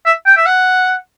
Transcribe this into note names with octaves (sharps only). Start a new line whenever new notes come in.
E5
G5
E5
F#5